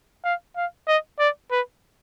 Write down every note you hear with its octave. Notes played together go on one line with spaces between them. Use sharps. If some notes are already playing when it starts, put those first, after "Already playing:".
F5
F5
D#5
D5
B4